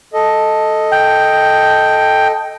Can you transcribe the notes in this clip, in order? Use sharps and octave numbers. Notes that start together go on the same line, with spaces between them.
A4 D#5
G5